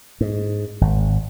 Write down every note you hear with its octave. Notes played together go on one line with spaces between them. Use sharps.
G#2
G#1